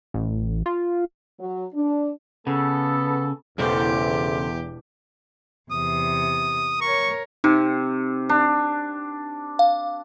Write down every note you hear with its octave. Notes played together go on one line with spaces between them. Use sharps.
A1
F4
F#3
D4
C#3 B3 A4
E1 E2 C#3 D4 G4 A4 C5 D6
E2 C3 D#6
A#4 C#5 C#6
C3 D#4
D4
F5